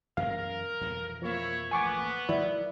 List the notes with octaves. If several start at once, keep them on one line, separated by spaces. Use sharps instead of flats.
F#2 E3 C#4 A#4 F5
F2 B2 E3
F3 A#3 E4 C#5
A1 D2 B3 G#5 C#6 D6
D#3 F3 F#3 E4 D5